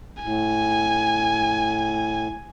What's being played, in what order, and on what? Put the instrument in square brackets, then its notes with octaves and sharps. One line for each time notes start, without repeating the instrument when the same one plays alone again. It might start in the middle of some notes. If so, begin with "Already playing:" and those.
[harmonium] A2 [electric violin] G#5